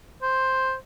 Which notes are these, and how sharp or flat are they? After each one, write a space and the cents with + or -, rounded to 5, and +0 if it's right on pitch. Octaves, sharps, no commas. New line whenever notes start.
C5 +5